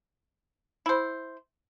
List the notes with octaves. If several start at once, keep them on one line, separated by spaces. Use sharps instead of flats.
E4 C5